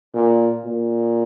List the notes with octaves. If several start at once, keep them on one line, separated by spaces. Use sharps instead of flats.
A#2
A#2